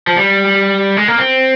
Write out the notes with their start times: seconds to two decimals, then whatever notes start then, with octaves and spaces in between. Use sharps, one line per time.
0.07 F3
0.16 G3
0.97 G#3
1.08 A#3
1.18 C4